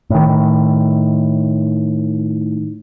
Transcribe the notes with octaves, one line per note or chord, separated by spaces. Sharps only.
A2 D#3